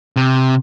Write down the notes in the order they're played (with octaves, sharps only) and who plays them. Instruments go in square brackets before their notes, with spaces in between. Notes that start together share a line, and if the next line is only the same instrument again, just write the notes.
[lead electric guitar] C3